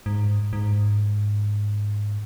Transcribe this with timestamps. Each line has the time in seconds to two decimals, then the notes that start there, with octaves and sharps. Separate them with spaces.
0.06 G#2
0.53 G#2